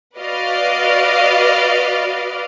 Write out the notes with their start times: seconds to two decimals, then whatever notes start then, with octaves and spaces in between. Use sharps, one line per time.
0.17 F#4 B4 D5 D#5 F5